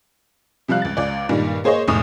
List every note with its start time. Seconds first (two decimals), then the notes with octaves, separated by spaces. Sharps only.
0.68 C3 F3 G3 F5 F#6
0.82 C#2 A6
0.97 C#2 D5
1.29 G2 A#2 D#3 G3
1.64 A#3 G#4 C5 C#5 D#5
1.88 F1 A2 D#6 F7